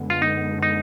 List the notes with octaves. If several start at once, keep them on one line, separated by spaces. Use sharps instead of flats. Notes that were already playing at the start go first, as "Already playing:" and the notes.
Already playing: F#2 D3 G#3 B3
F4
D#4
D#4